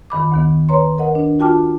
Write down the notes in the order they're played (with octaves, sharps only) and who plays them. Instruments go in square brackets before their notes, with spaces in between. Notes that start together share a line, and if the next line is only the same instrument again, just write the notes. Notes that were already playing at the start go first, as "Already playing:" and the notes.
[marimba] F2 D#3 B5 D6
D2 D#3 B3
B4 C#5 A#5 C6
A#4 D#5 F#5
D4
F4 F#4 G5 A5 D6 F6